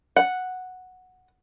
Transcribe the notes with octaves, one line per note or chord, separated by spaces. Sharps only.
F#5